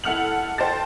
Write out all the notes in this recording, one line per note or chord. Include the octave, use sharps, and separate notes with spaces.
E4 A4 F#5 F6 F7 F#7
C5 G5 A5 A6